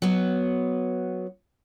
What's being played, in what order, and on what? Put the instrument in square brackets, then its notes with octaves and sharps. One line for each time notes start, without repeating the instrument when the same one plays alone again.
[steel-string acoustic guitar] F#3 B3